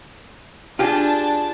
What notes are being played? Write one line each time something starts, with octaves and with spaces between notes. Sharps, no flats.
D4 F4 G4 G#4 A5